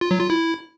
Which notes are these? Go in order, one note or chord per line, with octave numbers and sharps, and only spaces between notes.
F4
F#3
F4
E4